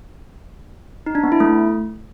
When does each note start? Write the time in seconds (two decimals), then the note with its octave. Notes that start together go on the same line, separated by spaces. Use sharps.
1.06 D#4
1.15 D4
1.23 B3
1.32 E4
1.40 A3